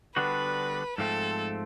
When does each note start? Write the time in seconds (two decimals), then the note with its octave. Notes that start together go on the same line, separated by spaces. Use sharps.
0.16 D3 G3 B3 D4 F#4 B4
0.98 G#2 F3 A3 C4 A4